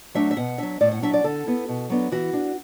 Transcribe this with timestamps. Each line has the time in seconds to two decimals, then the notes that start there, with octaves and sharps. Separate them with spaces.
0.15 F#3 A3 D4 E5
0.31 E5
0.37 B2 F#5
0.58 F#3 D4 E5
0.81 A2 D5
0.92 F#5
1.02 F#3 D4 E5
1.13 D5
1.24 D3 A4
1.46 B3 E4
1.68 B2
1.90 F#3 B3 D4
2.12 E3 F#4
2.33 D4